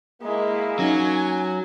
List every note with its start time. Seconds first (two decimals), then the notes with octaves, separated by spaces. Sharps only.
0.22 G#3 A#3 E4
0.79 F#3 C#4 D#4 G#5